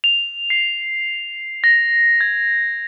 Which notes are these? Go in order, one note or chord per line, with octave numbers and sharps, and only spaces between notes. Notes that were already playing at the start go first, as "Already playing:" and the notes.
F7
C7
A#6
G#6